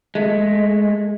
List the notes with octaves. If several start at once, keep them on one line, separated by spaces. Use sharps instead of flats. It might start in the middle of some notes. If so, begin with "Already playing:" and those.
G#3 A3